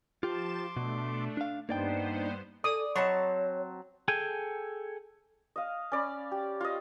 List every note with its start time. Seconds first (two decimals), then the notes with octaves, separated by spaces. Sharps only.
0.23 F3 F4 G4 A5 C6 D6 E7
0.77 B2 A3 D4
1.37 D4 F5
1.69 G2 A#3 B3 D4 D#4 C5 D5 G5
2.64 A4 D5 D#6
2.96 F#3 C4 C#5 D#5 A5 B5 C#6
4.08 G#4 A4 G5 G#5
5.56 D#5 F5
5.92 C#4 D5 B5
6.31 G4
6.61 F4 D#5